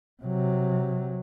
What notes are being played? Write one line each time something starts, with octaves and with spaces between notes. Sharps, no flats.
C3 F#3